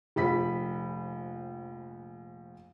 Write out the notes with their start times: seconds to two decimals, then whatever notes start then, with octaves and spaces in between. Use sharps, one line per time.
0.16 F1 A#1 B5 B6